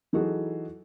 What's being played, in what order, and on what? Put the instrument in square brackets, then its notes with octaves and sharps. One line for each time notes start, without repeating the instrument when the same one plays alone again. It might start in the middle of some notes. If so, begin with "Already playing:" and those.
[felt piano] E3 F#3 D#4 F#4 G#4 A4